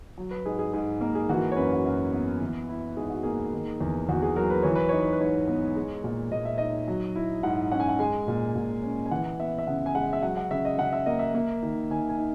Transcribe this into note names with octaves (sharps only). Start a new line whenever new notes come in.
F#3
B4
G#2 G#4
G#4
G#2 G#4
A#3 A#4
G#4
E3 F#4
C#5
F#2 B4
F#4
F#2
B3
E3
E4
G#2 G#4
F#4
A#3 G#4
D#3
E2
E2 F#4
G#4
F#3 A#4
B4
E3 C#5
B4
D#4 C#5
B4
B4
G#2 C#5
B3
G#3
A#2
A#2 D#5
E5
D#4 D#5
F#3
E4
G#2 F#5
C#4 F#5
G#5
F#5
G#3 G#5
A#2
A#2
C#4
G#5
E3 F#5
B3 E5
E5
C#3 F#5
G#5
G#3 F#5
E5
F#3 F#5
F#5
C#3 E5
D#5
C#3 F#5
E5
A#3 D#5
E5
A#3
D#3
D#3 G#5
G#5
D#4